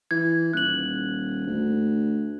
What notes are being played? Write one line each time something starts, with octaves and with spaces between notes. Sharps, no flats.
E3 G#6
D#1 F#6 F#7
D2